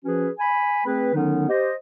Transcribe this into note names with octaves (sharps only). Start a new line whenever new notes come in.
F3 C#4 F#4 G#4 B4
G#5 B5
A3 C4 G#4 B4
D3 D#3 F#3 B3 C#4 D#4
G4 C5 D#5